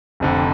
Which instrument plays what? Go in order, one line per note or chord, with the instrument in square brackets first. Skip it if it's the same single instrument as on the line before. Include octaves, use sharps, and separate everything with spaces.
[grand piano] F1 F2 D3